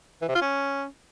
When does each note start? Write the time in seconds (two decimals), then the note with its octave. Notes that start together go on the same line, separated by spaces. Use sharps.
0.22 E3
0.28 C3
0.35 F4
0.42 C#4